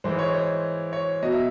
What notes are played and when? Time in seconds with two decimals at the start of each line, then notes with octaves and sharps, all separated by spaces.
0.04 G#2 E3 G#3 C5
0.19 C#5
0.34 C5
0.93 C#5
1.23 B2 F#3 D#5
1.32 E5